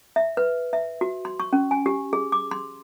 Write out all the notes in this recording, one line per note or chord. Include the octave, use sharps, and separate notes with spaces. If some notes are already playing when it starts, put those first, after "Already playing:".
E5
B4
E5
F#4
C6
C#6
C#4
G#5
G4
G#4
D6
C6